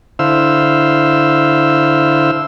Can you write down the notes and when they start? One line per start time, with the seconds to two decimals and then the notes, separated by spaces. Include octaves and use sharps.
0.19 D3 E4 C5 F5 E6